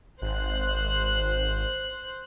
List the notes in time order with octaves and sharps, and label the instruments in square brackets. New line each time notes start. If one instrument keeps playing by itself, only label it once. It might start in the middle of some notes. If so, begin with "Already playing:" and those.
[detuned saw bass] G#1 [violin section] C5 F#6